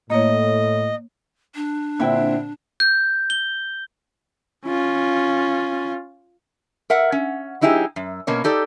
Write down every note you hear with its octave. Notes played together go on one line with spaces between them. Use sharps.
A2 A#3 C#5 D#5
D4
A#2 D3 C4 E4 E5 G5
G6
G7
C#4 F4
A#4 E5 F#5
C#4
F#3 D#4 E4 G4 G#4
F#2
B2 A#3 C#4 C#5
D#4 G4 A4 D5